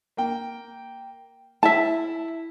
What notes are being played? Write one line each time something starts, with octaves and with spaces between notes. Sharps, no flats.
A#3 G5
E4 E5 A5